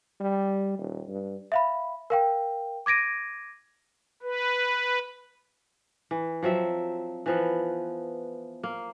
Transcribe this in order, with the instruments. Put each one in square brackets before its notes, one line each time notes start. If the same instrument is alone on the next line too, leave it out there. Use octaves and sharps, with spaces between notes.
[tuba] G3
D#1
G2
[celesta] E5 F5 B5
A#4 F5 G5
D6 G#6 A#6 D7 D#7
[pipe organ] B4
[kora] E3
F3 F#3 C4 E5
E3 F3 B3
A#3